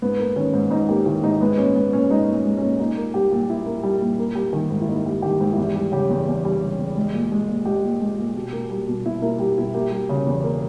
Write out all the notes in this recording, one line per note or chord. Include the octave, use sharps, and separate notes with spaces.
G#2 B3
A#3
D#3 C#4
G#2
G#2 D#4
A#3 G4
D#3 E4
G#2 D#4
G#3 B3
A#2 C#4
G#3 B3
A#2 C#4
G#3 D#4
A#2
C#4
G#3
A#2 C#4
A#2 D#4
A#3
G3 G4
A#2
A#2 E4
A#3
G3
A#2
A#3
G3
D#3
G#2
E4
A#3 D#4
G3
D#3 G4
G#2
E4
E2 G4
G3
C#3 G4
E2
E2
G3
C#3
E2
G#3
A#2
G#3
A#2
G#3 G4
A#2
G#3
A#2
B2
A#3
G3
B2
B2 E4
A#3 E4
G3 G4
B2 E4
A#3 G4
G3
C#3
E2
A#3